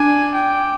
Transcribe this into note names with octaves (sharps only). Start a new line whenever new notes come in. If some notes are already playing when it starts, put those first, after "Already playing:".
Already playing: D4 G#5
G5